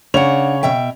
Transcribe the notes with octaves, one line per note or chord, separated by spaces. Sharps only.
C#3 D4 C#5 F#5 F7
B2 E5 G5